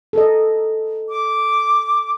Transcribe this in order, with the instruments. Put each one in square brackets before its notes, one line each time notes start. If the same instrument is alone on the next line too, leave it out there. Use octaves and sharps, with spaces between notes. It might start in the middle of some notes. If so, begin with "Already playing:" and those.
[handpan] A4 A#4 D#5
[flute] D6